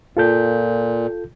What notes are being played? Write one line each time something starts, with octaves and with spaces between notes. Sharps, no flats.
A#2 F4 A4 G6